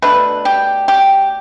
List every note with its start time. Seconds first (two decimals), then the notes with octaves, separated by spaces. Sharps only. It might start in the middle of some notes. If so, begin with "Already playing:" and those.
0.02 B2 A3 D4 B4
0.45 G4
0.88 G4